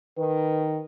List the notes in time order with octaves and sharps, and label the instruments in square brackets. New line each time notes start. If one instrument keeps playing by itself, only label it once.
[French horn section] D#3 [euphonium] B4